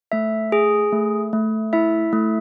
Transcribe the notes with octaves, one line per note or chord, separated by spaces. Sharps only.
A3 E5
G#4
A3
A3
E4 E5
A3